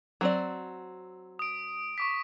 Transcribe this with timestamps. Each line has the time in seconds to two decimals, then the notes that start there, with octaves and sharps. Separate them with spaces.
0.21 F#3 C4 D5
1.39 D#6 D7
1.98 C#6 D6 B6